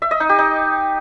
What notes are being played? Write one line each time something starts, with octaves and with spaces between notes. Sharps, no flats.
E5
D#5
D#4
G4
D#4